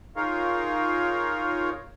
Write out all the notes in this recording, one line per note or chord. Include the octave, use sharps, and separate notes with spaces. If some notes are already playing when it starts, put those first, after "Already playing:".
D#4 F4 G#4 A#4 C#5 F5